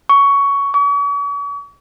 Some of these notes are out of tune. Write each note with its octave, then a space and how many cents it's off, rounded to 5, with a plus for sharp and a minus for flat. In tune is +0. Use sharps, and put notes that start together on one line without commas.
C#6 +15
C#6 +45